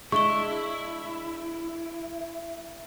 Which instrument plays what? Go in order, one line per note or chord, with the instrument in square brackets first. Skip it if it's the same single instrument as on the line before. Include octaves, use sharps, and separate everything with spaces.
[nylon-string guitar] G#3 D4 [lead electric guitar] E4 [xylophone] C#6 G7